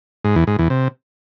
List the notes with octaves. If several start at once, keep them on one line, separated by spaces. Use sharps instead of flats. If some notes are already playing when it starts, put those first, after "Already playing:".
G#2
E2
G#2
E2
C3